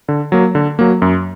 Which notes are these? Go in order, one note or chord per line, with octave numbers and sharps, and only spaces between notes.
D3
F#3 A#3
D3
F#3 A#3
F#2